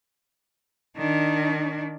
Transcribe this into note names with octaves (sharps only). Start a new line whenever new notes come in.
D#3 D4